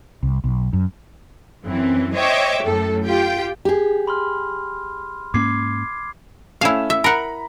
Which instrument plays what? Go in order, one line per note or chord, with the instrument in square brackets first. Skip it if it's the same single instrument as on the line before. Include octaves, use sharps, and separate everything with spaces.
[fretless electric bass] C2
B1
F#2
[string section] F#2 E3 C4
C5 C#5 D#5 E5 G5 D6
F#2 A2 A4
F4 G4 G5
[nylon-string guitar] G4 G#4
[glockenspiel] B5 C6 F6
[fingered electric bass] G#2 A#3 C#4 [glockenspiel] D6 G#6 C7
[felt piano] A3 C#4 E7 [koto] E4 F5
[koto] E5
[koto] A#4 F#5 [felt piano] A#5 B5